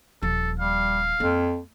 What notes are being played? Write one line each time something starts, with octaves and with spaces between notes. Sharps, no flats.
D#1 F3 A4
G3 F5
F2 A#3